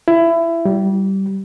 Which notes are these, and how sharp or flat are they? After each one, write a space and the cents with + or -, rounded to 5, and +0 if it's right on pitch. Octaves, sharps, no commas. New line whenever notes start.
E4 +20
G3 -20